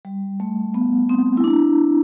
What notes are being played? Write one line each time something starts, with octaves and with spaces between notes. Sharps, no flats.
G3
A3
B3
C4
E4
D4